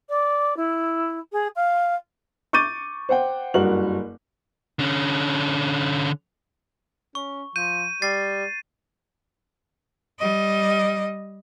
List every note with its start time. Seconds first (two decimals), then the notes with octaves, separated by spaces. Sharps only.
0.09 D5
0.57 E4
1.32 G#4
1.56 F5
2.53 C#6 D6 G6 A6 D#7
3.09 C5 F#5 G5
3.54 F#1 G2 F#4 A#4 F#7
4.79 D3 C#4
7.15 C#4 C#6
7.56 F3 G6 D#7
8.02 G3 A6 C7
10.19 G3 D#5